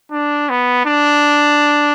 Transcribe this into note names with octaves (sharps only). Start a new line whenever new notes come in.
D4
B3
D4